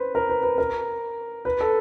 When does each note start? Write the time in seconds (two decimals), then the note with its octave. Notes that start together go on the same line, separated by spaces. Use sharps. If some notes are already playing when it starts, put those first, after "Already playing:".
Already playing: B4 C5
0.15 A#4
0.29 B4
0.43 B4
0.58 A#4
1.45 B4
1.61 A4